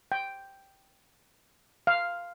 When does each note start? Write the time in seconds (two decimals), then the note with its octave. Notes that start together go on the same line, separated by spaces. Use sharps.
0.12 G5
1.87 F5